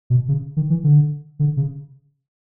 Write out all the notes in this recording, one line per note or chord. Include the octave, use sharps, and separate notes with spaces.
B2
C#3
D#3
E3
D3
D3
C#3